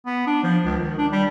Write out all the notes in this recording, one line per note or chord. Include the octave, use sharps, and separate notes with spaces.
B3
D4
F3
C#2
D#3
D4
G3